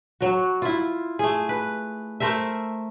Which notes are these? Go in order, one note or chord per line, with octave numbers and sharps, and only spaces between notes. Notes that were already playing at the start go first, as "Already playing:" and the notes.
F#3 F#4
E4 F4
A3 G#4
B4
A3 A#4 C5 E5